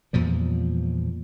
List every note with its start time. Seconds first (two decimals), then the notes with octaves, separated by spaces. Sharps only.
0.13 E2 A#2 F3 G3